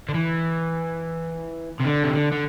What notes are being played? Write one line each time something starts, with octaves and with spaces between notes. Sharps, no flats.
D3
E3
C3
D3
C3
D3
D3